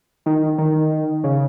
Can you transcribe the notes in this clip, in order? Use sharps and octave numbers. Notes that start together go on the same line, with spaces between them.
D#3
D#3
C#3